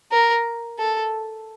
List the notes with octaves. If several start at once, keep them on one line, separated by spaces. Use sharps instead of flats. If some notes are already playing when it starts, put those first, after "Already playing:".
A#4
A4